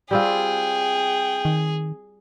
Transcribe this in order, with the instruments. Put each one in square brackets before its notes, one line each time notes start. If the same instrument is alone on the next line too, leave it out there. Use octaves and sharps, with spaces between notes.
[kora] G3 C4 F4 [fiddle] G#4 [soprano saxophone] G5
[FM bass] D#3